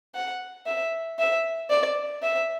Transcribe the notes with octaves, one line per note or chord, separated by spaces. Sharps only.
F#5
E5
E5
D5
E5